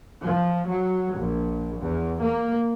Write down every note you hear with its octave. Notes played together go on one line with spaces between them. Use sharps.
F3
F#3
A#1
E2
A#3